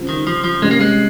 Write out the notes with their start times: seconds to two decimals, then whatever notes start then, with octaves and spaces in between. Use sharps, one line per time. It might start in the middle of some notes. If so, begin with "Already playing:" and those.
Already playing: C#3 G3 C4 F4
0.09 D#3
0.27 F3
0.44 F3
0.62 C3 G3 G#3 C#4 G4
0.71 A#3
0.81 G#3